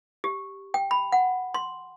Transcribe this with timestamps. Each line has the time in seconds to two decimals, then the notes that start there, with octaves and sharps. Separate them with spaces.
0.24 G4
0.74 G5
0.91 B5
1.12 F#5
1.54 C6